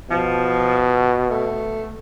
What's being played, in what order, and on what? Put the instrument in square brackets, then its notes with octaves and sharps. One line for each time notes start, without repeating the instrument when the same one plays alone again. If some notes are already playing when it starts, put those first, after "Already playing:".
[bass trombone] B2 [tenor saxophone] F3
[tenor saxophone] A3